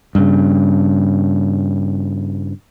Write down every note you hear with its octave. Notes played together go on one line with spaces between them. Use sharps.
G2 C#3